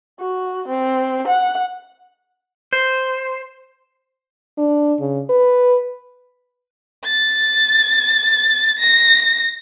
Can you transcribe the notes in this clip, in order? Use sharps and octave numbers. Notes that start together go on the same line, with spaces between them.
F#4
C4
F#5
C5
D4
C#3
B4
A6
A#6